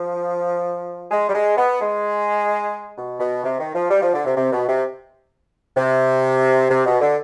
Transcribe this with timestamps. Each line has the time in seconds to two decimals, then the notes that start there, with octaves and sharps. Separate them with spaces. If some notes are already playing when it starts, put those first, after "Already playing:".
Already playing: F3
1.11 G#3
1.29 G3
1.34 G#3
1.57 B3
1.81 G#3
2.97 B2
3.20 B2
3.44 C3
3.59 D#3
3.74 F3
3.90 G3
4.02 F3
4.14 D3
4.26 C3
4.36 C3
4.52 B2
4.68 C3
5.76 C3
6.70 C3
6.86 B2
7.00 D3